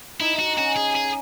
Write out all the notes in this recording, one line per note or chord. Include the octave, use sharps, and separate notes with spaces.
D#4 E4
D#4 F#4
C#4 F#4
G#4
G#4